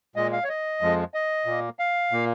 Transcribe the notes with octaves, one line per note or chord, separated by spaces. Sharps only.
A#2 G#3 D#5
F5
C#5
D#5
F2 F3 G#3
D#5
A#2 A#3
F5
A#2 A#3